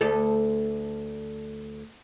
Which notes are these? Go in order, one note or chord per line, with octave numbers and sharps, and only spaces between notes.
D2 A4